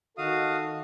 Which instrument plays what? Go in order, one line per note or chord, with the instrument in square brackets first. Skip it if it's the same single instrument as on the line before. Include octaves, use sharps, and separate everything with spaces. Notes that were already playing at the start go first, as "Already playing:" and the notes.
[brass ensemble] D#3 A4 D#5 [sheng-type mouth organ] F#4 F5 D#6